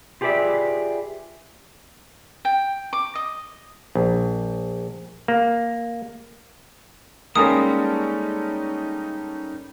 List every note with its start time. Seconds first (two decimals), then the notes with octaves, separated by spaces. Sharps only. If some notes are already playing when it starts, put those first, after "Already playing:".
0.21 F4 G4 G#4 B4 D5 E5
2.45 G5
2.93 D6
3.15 D#5
3.95 A#1
5.28 A#3
7.35 G3 G#3 A#3 C#4 D#4 A4 A#4 D#6